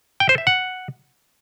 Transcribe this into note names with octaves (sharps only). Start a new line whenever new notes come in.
G5
C5
E5
F#5